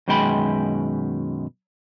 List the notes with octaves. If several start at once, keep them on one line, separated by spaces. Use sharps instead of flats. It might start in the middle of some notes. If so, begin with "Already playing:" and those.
F#2 B2 D#3 G#3 G5 B5